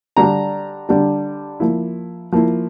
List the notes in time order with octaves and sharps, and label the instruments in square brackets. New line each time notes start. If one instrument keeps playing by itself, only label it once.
[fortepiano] D3 G3 D4 A#5
D3 G3 D4
F3 A#3 E4
F3 A#3 E4